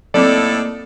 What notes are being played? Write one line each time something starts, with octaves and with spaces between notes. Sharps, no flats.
A2 F#3 A#3 C4 D#4 A4 D5 D6